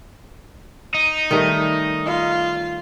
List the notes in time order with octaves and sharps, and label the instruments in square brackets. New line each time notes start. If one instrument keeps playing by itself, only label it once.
[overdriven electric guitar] D#4
[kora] D#3 G3 A3
[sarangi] F4